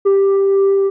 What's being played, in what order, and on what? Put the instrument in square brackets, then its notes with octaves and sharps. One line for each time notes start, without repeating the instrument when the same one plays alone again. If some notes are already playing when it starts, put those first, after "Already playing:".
[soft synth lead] G4